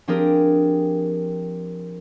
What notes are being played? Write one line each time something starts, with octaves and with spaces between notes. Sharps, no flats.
F3 C4 D4 G4 G#4 A#4